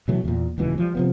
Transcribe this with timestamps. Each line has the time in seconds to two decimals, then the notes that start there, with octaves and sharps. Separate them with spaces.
0.08 B2 E3 F#3 A3
0.24 E2 A#2
0.58 D#1 C#2 B2 E3
0.78 F3 G3
0.95 C3 F3 B3